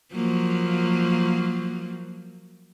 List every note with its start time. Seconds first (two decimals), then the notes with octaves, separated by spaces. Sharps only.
0.14 F3 F#3 A#3